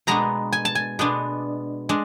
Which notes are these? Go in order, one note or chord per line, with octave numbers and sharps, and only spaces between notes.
B2 G#3 B3 D4 A#5
G#5
A5
G#5
B2 G#3 B3 D4
G#3 D4